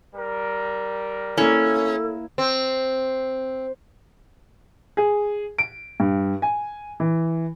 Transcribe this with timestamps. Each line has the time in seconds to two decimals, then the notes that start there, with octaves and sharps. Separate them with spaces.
0.15 G3 A#4
1.37 A#3 C#4 E4 A4
2.38 C4
4.97 G#4
5.59 D7
6.00 G2
6.42 G#5
7.00 E3